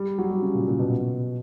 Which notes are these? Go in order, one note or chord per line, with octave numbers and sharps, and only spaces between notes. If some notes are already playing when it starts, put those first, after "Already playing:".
Already playing: G3
F#3
G3
C#3
A#2
A#2
B2